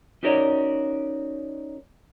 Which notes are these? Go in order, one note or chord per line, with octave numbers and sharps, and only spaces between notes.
C#4 D#4 F#4 A#4 C#5 D5